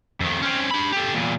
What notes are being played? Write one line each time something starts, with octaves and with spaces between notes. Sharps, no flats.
F2 D#3
C4 C#4
D4 B5
G4 A4
E2 A#2